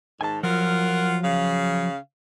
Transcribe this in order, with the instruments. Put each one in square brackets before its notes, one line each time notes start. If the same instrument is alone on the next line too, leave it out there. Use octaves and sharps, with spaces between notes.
[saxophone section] G#2 D#3 [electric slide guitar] G#5 A5
[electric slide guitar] F3 F#3 [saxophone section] F4 A#4 F#5
[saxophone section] C#3 F5